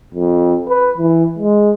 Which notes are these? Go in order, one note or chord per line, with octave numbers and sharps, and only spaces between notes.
F2
B4
E3
G#3